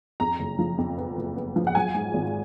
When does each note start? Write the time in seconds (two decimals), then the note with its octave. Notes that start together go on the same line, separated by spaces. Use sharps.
0.20 F2 A#5
0.39 F#1
0.59 F3
0.78 F2
0.98 B3
1.17 F#1
1.36 B3
1.56 F3
1.67 F#5
1.75 F#3 G#5
1.95 G#2
2.14 G#1